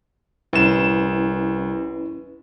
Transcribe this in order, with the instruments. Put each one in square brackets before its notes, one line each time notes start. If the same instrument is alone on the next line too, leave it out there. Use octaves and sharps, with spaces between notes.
[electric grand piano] C2 E7 [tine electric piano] C#4 E4 B4